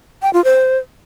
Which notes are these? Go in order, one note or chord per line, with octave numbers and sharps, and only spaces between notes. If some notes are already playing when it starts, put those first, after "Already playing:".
G5
F4
C5